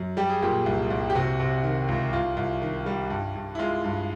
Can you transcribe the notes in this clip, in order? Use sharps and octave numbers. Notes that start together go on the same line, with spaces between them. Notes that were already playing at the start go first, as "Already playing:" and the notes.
Already playing: F#2
G3 G4
G#4
A#2 G4
C2
C2
G4
C3 F#4
C3
D#3
C#2
C2 F4
C2
D#3
G3
G2
G2
E4
G#3 F4
G2